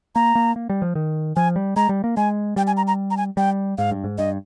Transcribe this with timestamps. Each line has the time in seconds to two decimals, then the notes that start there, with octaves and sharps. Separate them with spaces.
0.15 A#3 A#5
0.35 A#3
0.56 A#3
0.70 G3
0.82 F3
0.95 D#3
1.36 F3 G#5
1.56 G3
1.76 G#3 A#5
1.89 G3
2.04 A#3
2.17 G#3 G#5
2.56 G3 G5
2.67 G#5
2.77 A#5
2.87 A#5
3.11 A#5
3.17 G#5
3.37 G3 G5
3.78 G#2 F5
3.91 G2
4.04 G#2
4.18 G2 D#5